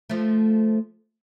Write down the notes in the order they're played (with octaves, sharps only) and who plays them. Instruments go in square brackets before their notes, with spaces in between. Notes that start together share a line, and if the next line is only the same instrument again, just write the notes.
[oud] F3 A3